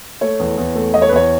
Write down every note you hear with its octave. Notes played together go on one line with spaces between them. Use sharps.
A3 C#5
E2
E2
A3
E2 D#5
C#5
B4
E2 C#5